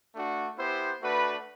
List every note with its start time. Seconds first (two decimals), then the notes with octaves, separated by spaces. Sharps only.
0.14 A3 D4 F#4
0.58 B3 E4 G4 C5
1.01 A3 D4 F#4 B4